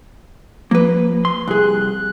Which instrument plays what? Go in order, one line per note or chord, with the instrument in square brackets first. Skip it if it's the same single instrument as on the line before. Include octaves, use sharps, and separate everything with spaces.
[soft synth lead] F3 [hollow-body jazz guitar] A#3 B4
[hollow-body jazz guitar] C6
[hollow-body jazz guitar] C2 G#4 [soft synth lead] F#6